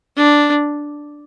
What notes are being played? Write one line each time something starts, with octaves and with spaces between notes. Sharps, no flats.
D4